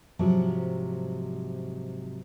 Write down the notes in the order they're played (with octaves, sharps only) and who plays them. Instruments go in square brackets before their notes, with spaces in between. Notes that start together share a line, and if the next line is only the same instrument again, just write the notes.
[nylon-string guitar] G#2 C3 F3 F#3